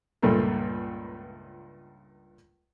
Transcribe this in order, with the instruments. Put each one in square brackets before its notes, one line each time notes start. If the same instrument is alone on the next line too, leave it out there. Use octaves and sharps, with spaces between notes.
[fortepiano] C#2 G2 A#2 A3 A#3